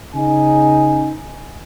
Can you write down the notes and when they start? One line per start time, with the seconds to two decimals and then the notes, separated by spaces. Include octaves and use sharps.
0.15 C#3 D#4 G#5